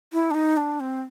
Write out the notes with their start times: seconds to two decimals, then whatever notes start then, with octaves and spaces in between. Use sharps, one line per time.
0.13 E4
0.31 D4
0.34 D#4
0.57 D4
0.80 C4